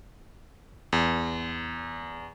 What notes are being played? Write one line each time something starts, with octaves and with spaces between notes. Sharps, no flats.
E2